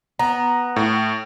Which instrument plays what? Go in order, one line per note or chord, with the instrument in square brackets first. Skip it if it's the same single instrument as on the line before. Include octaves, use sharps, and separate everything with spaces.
[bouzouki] B3 [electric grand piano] A#5
[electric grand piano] A2